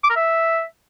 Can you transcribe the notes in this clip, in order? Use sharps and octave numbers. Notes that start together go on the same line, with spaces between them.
D6
A#4
E5